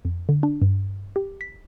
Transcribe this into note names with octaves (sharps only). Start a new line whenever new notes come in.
F2
D3
D4
G2
G4
B6